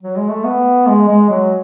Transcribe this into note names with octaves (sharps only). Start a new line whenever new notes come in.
F#3
G#3
A3
B3
G#3
G#3
F#3